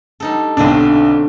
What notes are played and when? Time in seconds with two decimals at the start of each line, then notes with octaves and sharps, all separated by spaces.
0.20 G3 D#4 A4
0.57 B1 D3 C4 D4 F4